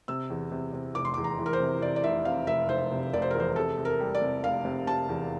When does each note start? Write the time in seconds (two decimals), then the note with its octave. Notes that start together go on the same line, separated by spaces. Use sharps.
0.08 C3 E6
0.30 E2
0.52 C3
0.73 C3
0.95 F1 D6
1.05 C6
1.14 D6
1.17 E2
1.24 A#5
1.38 E3
1.46 A#4
1.53 C5
1.60 C3
1.82 C3 D5
1.96 D5
2.04 F1 E5
2.25 C3 F5
2.47 F1 E5
2.69 F1 C5
2.92 C3
3.13 F1 D5
3.22 C5
3.31 A#4
3.35 E2 C5
3.56 C3 A4
3.78 C3
3.85 A#4
4.00 G3
4.15 D5
4.22 C3
4.43 F1 F5
4.65 C3
4.87 C3 A5
5.09 E2